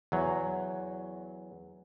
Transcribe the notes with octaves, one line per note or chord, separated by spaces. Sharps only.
E2 F#3